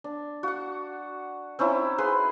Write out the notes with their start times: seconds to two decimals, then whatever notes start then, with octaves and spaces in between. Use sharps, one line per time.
0.04 D4
0.43 F#4 F#5
1.59 C4 C#4 D#4 E4
1.98 G#4 B4 C6